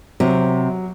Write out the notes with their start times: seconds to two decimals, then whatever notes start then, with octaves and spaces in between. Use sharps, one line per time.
0.20 C3 F#3